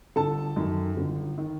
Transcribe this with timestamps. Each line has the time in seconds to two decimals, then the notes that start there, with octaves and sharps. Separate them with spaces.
0.16 G1 A4 A5
0.56 F#2 D#3
0.97 G1
1.38 D#3